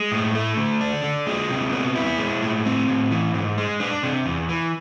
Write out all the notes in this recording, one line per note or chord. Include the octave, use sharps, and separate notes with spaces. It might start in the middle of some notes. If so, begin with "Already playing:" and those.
Already playing: G#3
A2
A3
D3
D4
D3
G#3
C3
B3
E4
G#3
A2
C4
A2
E3
G#2
G#3
D4
C3
E2
E3